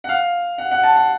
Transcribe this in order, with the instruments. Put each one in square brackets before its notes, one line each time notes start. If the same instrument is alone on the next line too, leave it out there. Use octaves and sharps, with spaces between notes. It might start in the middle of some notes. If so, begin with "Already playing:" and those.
[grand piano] F#5
F5
F#5
F#5
A5
F#5